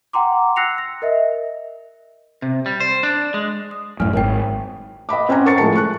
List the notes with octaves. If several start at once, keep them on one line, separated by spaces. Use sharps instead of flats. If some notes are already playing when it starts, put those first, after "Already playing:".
F#5 G5 A#5 C6 D6
E6 F#6 A#6 C7 C#7 F7
A#6
A#4 D#5 E5
C3
G3
C5
D4
G#3
D#6
F#2 A2 G#5 F6
G#1 A#4 C#5 G5
D#5 F#5 B5 D6
C4 C#4 F#5 G#5 A#5
A#4 C#6 A6 C#7
A2 F3 G#3 A#4 A5 C#7
C#6 F#6